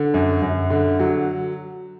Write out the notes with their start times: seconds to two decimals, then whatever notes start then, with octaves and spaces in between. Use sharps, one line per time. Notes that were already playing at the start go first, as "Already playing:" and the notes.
Already playing: D3
0.14 F#2
0.42 F#2
0.70 D3
1.00 F#3